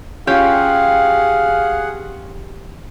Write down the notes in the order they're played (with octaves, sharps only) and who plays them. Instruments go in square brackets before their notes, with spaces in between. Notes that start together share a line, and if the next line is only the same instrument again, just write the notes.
[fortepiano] C#4 F4 [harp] G4 [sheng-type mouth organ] G#4 F#5 [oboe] F5